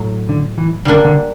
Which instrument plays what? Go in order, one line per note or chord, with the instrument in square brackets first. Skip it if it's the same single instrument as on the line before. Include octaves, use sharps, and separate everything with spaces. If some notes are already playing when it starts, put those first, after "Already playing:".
Already playing: [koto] A2 F#3
[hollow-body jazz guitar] D3
E3
[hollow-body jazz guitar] D3 [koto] G3 A#3 D4
[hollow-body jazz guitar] D3